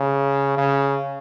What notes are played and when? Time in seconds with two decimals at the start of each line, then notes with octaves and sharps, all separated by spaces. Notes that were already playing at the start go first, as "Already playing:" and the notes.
Already playing: C#3
0.57 C#3